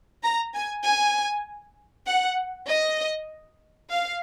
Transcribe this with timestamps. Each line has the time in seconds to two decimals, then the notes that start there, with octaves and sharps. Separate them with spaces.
0.24 A#5
0.54 G#5
0.86 G#5
2.07 F#5
2.68 D#5
3.91 F5